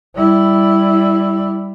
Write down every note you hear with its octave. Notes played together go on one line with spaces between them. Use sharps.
G3 E4